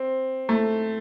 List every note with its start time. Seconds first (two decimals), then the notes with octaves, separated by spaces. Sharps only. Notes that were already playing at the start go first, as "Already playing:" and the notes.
Already playing: C4
0.49 A3